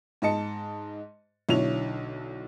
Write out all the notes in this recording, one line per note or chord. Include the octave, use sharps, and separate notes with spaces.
G#2 D#5 A5 C#7
B1 D3 E4 C#5 F7